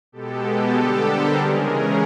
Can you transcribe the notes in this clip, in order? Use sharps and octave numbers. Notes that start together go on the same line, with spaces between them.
B2 G#3 B3 G4 A4
G4 A4
D3 G3 B3 D4
A#4 C5
C#3 E3 G#3 C#4 G#4 A#4
G#4 A#4